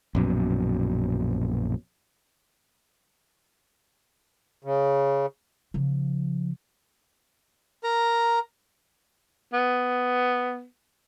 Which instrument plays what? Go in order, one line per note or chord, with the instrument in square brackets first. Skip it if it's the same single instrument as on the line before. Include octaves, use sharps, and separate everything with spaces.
[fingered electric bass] A#1 F#2 B2
[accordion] C#3
[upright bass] C#3 F3
[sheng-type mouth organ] A#4 A#5
[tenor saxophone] B3